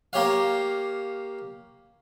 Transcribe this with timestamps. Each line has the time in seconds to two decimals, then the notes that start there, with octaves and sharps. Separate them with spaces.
0.13 A#3 G4 C#5 F5